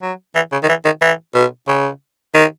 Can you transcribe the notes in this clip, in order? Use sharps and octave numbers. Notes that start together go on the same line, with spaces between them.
F#3
E3
C#3
D#3
E3
D#3
E3
B2
C#3
D#3